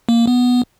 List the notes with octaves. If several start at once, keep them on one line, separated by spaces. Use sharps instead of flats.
A#3
B3